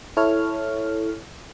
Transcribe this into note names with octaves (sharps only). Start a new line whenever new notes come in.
E4 A4 C#5 F6